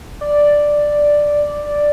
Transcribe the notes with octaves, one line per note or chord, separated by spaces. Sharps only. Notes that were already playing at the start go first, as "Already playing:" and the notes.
D5